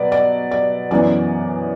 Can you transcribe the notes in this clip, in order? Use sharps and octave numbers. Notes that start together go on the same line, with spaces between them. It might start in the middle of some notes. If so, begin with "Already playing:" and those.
Already playing: B2 F#3 B4 D5
D5
D5
F#2 E3 B3 D5